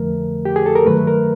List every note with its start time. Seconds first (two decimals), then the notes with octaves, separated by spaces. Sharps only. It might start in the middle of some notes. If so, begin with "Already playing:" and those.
Already playing: F2 D3 F3 A3 A#4
0.45 G4
0.56 G#4
0.66 A4
0.76 A#4
0.86 G2 D#3 F#3 A3 B4
1.07 A#4